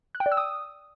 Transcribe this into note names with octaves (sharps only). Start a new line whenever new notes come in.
F#6
G5
D5
E6
D#6